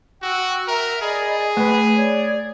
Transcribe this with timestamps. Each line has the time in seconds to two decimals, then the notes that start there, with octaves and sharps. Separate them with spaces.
0.22 F#4 G5 E6
0.67 A#4 E5
1.01 G#4 D5 D#5 B5
1.57 A3 B4
1.96 C#5 D5